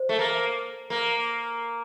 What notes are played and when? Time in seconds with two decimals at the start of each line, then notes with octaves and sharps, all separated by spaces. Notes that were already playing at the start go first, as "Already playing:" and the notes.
Already playing: C5
0.09 A3
0.19 A#3
0.90 A#3